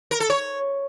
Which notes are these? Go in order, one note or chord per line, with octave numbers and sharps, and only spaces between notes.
A#4
A4
C#5